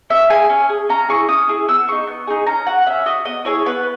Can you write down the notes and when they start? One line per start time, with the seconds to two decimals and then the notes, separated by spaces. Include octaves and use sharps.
0.10 C#4 E5
0.29 G#4 G#5
0.49 C#4
0.69 G#4
0.89 C#4 A#5
1.09 E4 G#4 C#6
1.28 C#4 D#6
1.49 E4 G#4
1.68 B3 E6
1.88 D#4 G#4 C#6
2.07 B3
2.27 D#4 G#4
2.47 C#4 A#5
2.67 F#4 F#5
2.86 C#4 E5
3.06 F#4 D#5
3.25 B3 D#5
3.45 E4 G#4 C#5
3.66 B3 B4